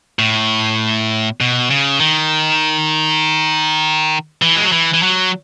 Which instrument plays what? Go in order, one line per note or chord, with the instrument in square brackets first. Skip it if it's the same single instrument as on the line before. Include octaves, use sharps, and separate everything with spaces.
[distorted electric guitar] A2
B2
C#3
D#3
E3
G#3
F#3
E3
E3
F#3